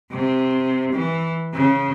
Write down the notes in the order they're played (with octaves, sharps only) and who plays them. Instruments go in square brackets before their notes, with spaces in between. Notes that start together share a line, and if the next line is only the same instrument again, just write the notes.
[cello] C3
E3
C#3